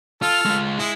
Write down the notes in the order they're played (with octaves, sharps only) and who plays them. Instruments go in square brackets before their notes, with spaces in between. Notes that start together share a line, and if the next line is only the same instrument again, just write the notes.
[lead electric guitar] F4 [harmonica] A4 F6
[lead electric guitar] G#3 F4
[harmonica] G#3 [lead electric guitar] E4